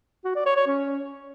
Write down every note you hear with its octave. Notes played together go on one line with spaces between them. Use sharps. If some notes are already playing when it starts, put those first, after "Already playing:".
F#4
D5
C#5
C#5
C#4